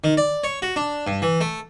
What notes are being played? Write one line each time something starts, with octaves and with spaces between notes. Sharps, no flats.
D#3
D5
C#5
F#4
D4
G2
E3
A3